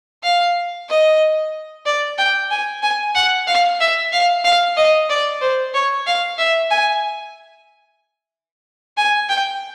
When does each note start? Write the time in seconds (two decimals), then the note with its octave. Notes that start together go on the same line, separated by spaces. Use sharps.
0.23 F5
0.89 D#5
1.86 D5
2.18 G5
2.51 G#5
2.82 G#5
3.15 F#5
3.47 F5
3.80 E5
4.12 F5
4.44 F5
4.77 D#5
5.09 D5
5.41 C5
5.74 C#5
6.07 F5
6.38 E5
6.70 G#5
8.97 G#5
9.29 G5